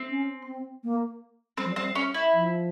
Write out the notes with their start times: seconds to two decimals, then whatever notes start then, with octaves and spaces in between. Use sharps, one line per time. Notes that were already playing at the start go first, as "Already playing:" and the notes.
Already playing: C4
0.10 C#4
0.47 C4
0.84 A#3
1.57 G3 C4
1.65 F3
1.72 G3 C4
1.95 C#4
2.14 E4
2.33 F3